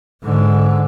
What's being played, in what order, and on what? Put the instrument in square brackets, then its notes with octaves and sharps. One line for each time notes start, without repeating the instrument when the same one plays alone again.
[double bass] G#2 D3